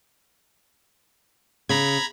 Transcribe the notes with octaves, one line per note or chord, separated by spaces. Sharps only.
C#3 A#5 B5 G#6